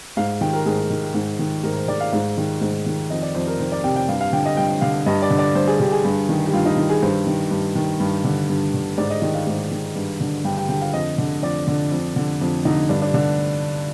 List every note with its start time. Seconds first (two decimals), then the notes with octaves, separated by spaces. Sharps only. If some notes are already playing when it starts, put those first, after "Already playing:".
0.17 G#2 F5
0.41 D#3 G5
0.53 A#4
0.66 G#2 G#4
0.90 D#3
1.14 G#2
1.39 D#3
1.64 G#2 A#4
1.76 C5
1.88 D#3 D5
2.00 F5
2.12 G#2 F5
2.38 D#3
2.61 G#2
2.86 D#3
3.10 F2 D#5
3.22 D5
3.35 F2 C5
3.47 A#4
3.59 D#3 C5
3.72 D5
3.84 C3 G5
3.96 G5
4.08 G2 F5
4.21 F5
4.33 D3 G5
4.45 D#5
4.57 G2 G5
4.81 D3 F5
5.06 G2 D#5
5.22 D5
5.30 D3
5.39 D5
5.55 G2 C5
5.68 G#4
5.80 D3 G4
5.92 G#4
6.05 G2
6.29 D#3
6.46 G4
6.54 G2 F4
6.66 D#4
6.77 D#3
6.90 G#4
7.02 G2 C5
7.27 D#3
7.51 G2
7.75 D#3
8.00 G2
8.24 D3
8.49 G2
8.74 D3
8.98 G#2 D5
9.10 D#5
9.22 D#3 D#5
9.35 F5
9.47 G#2
9.72 D#3
9.96 G2
10.20 D3
10.44 G2 G5
10.58 G5
10.69 D3 G5
10.82 F5
10.93 F2 D#5
11.18 D3
11.42 F2 D5
11.67 D3
11.91 F2
12.16 D3
12.41 F2
12.65 D3 D#4
12.89 G2 D4
13.02 D4
13.14 D3 D4